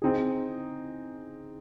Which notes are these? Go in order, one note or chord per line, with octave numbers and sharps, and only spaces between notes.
C4 D#4 G#4